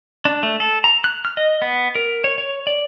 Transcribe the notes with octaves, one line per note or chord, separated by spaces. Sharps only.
D4
A3
A4
A#5
F#6
F6
D#5
B3
A#4
C#5
C#5
D5